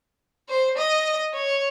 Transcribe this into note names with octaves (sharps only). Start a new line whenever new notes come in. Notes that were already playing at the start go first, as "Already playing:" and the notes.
C5
D#5
C#5